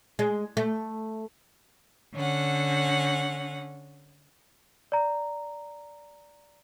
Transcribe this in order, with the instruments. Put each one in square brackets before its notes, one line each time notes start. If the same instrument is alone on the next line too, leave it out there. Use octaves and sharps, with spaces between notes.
[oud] G#3
A3
[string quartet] D3 C#4 F#5
[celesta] D5 A#5